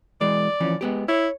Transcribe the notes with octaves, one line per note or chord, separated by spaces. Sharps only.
E3 G#3 D5
E3 F3 C#4
G#3 B3 G4
E4 C#5